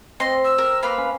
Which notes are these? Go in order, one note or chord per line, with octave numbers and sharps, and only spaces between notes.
C4 D#5 C6
E6
A#4
A#3 B4 F5 B5
C#4